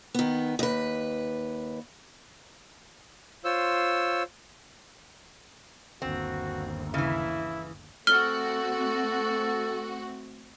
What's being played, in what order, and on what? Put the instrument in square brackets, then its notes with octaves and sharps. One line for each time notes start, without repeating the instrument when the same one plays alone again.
[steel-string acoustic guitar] D#3 B3
D#2 B4
[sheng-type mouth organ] F4 C5 C#5 E6
[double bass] G1 D#2 [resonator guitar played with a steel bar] C4 [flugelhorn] F#4
[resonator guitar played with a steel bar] C#3 E3 [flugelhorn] E4
[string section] A3 C4 F#4 [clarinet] A4 [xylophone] F6 G7